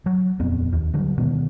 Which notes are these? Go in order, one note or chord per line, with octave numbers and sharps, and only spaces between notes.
F#3
D#1 F2 B3 C4
D#2
D3 F#3 G3
B2 D#3 G#3 B3